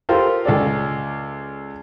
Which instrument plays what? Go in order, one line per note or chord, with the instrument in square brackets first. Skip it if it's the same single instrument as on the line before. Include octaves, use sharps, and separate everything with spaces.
[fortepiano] F4 G4 A4 A#4 C5
C#2 A4 D5